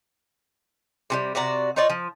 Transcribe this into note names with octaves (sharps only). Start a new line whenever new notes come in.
C3 E3 G3
C3 F#4 D5 A#5
D#4 F4 C#5 D5
F3